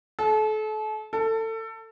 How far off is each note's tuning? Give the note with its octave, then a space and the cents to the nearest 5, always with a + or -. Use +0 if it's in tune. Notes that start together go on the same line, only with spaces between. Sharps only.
A4 -35
A4 +25